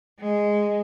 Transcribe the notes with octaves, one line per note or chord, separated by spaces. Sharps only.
G#3